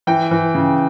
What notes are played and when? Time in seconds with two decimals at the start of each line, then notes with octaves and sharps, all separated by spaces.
0.07 E3 G5
0.31 E3
0.55 C#3